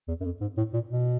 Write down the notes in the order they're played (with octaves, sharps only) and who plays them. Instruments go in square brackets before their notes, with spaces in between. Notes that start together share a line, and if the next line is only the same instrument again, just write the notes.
[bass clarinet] E2
F#2
F2
G#2
A2
A#2
B2